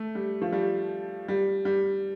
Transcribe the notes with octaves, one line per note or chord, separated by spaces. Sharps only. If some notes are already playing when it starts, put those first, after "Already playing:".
Already playing: A3
G3
F3
G3
G3
G3